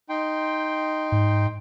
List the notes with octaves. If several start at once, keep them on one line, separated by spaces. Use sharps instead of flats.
D#4 G5 C6
G#2